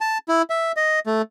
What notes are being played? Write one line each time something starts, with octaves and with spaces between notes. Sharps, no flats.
A5
E4
E5
D#5
A3